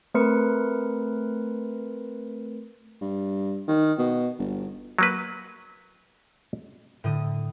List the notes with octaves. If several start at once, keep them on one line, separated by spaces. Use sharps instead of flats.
A3 C4 A#4 B4 C6 C#7
G2
D#3
B2
G1
F#3 A#3 B4
A2 D3 D#6